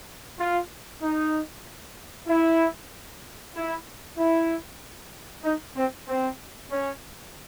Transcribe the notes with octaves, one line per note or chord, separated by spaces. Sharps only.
F4
D#4
E4
E4
E4
D#4
C4
C4
C#4